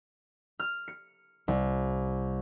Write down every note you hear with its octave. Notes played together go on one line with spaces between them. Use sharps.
F6
C#7
C2